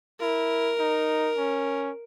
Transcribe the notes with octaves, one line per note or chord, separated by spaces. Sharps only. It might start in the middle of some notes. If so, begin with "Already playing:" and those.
E4 A#4
D#4
C#4